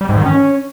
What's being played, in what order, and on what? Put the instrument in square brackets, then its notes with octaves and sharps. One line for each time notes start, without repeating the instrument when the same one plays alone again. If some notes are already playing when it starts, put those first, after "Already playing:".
[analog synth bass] G3
G#2
D#3
C#4